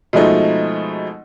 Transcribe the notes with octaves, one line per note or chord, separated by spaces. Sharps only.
B2 F3 G#3 A3 D#4